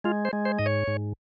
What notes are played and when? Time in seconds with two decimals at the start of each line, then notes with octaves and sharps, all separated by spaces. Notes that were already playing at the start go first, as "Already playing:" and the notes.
0.04 G#3 F4
0.25 C5
0.33 G#3
0.45 C5
0.59 G#2 D#5
0.66 C#5
0.87 G#2